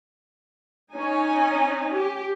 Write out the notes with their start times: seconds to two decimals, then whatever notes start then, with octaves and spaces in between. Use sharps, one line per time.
0.94 C#4 D#4 G#5
1.96 G4